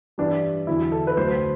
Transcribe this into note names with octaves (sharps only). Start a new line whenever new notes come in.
G2 E3 G3 D4
E2 D3 F#3 E4
A4
B4
D2 D3 F#3 A3 C5